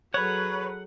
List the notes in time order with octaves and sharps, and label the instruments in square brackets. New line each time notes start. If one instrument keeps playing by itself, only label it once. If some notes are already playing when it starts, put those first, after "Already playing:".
[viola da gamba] F#3 G#4 A4 [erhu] B4 [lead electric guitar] C#5 [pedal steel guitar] F#5